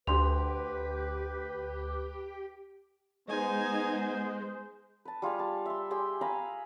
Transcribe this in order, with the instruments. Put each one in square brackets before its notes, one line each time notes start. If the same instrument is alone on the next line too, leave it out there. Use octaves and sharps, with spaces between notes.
[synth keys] D2 [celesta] D4 C6 F7 [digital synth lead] G4 [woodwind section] B4
[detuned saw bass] G#3 [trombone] B3 [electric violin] D#4 G#5 [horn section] G#4 C5
[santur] B4 A5
G3 F4 G#4 F5
A5
E5 C6
G4 G#4 G5 C6
F5 G#5 A#5 B5